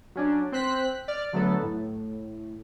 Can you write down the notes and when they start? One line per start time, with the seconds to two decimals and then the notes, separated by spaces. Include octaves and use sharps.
0.15 F#3 C#4 D4
0.52 C4 C5 F#6 B6
1.08 D5 F6
1.33 D3 F#3 A3 B3 A4
1.63 A2